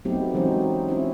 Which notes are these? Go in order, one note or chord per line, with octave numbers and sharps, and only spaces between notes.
F#3 A3 B3 C4 D#4 G4
E3 F#3 G#3 C4 C#4 D#4
C4 C#4 E4